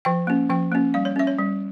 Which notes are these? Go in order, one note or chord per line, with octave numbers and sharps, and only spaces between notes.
F3 G5
A#3 C#4
F3 G5
A#3 C#4
G3 F5
C#5
C#4 E5
C#5
G3